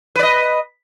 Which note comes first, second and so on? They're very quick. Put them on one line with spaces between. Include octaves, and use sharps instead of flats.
B4 D5 D#5